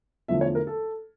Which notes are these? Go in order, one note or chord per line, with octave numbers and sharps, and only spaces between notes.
E2 D3 F3 A3 E5
C#5
A#4
A4